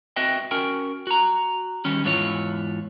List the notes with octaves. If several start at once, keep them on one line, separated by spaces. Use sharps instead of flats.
C4 F#4 B4 D#5 E5 G5
C#4 F#4 A#4 G5
F#4 A#5
D#3 G3 C#4
E2 G#2 E3 F4 C#5